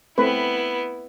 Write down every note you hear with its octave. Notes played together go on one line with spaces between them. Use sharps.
A3 B3 C4 E4 B4